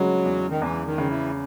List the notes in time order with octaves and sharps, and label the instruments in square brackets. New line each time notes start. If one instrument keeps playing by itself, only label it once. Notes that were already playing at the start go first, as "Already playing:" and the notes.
Already playing: [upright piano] C#3 G#3 [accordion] F#3
[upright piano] E2
[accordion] D#3
[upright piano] E2 [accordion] E3
[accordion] D#3
[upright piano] C#3
[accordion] E3